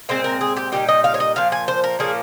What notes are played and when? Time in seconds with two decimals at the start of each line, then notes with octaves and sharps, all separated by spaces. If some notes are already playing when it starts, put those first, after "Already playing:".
0.09 A#2 G#3 C4 C5
0.24 A#4
0.41 G#4
0.57 G4
0.72 A#2 G3 C4 D#4 G4
0.89 D#5
1.04 F5
1.14 C#5
1.20 D#5
1.36 A#2 F3 F5
1.52 G#5
1.68 C5
1.84 A#4
1.99 A#2 F3 A#3 C#4 G#4